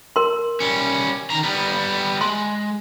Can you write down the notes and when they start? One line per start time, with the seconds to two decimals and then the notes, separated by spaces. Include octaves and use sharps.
0.16 A#4 C6
0.60 G3 C#4
1.30 D#3 A#5
1.43 G3 B3
2.21 G#3 C6